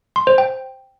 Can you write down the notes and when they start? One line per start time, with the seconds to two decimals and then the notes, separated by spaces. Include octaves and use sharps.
0.16 C6
0.27 C5
0.38 G5